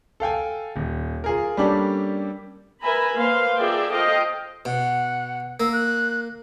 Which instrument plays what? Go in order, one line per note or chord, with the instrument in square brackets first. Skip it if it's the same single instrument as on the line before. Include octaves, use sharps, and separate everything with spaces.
[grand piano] A4 F5 G5 G#5
D#1
F4 G#4 A#4
G3 A#3 C#4 D4 G4 A4
[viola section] A#4 B4 E5 G#5 A#5 B5
A#3 B4 C5 F5 C6
F4 G#4 A#4 D5 E5 G5
F4 A4 C5 D#5 F5 G5
[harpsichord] B2 [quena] F#5
[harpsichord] A#3 [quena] E6
[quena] F#6